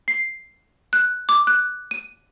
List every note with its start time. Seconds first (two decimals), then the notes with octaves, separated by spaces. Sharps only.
0.08 C7
0.93 F#6
1.29 D6
1.47 F#6
1.91 D#7